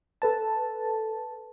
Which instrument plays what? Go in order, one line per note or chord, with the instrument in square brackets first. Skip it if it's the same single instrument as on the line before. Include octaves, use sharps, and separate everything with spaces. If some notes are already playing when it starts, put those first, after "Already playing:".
[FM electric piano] A4 B4 A5